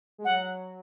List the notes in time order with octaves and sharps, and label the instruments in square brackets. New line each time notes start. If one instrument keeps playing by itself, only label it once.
[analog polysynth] G#3
[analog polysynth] F#3 [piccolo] F#5